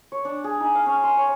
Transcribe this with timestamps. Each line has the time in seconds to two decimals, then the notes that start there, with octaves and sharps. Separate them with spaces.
0.12 C#5
0.25 D4
0.44 G#4
0.60 D#4
0.75 F5
0.86 C#4
1.04 C6
1.17 C#5